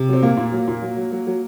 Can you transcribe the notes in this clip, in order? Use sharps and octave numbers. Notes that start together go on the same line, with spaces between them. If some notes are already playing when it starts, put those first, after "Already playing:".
Already playing: C3
F#3 C4
A#2 A#3
A#2
F#3
A#2
F#3
F#3
F#3
F#3